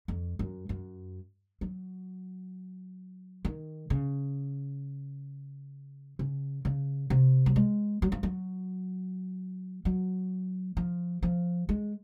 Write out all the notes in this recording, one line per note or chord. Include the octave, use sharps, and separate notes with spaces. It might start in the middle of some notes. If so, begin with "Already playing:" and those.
F2
F#2
F#2
F#3
D#3
C#3
C#3
C#3
C3
F#3
G#3
F#3
F3
F#3
F#3
F3
F3
G#3